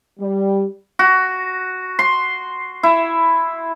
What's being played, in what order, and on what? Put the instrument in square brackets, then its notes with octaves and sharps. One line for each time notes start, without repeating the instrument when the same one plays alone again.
[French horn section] G3
[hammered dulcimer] F#4
C6
E4